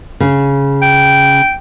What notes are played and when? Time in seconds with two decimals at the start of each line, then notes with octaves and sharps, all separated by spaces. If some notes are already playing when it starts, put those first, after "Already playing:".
0.20 C#3
0.82 G5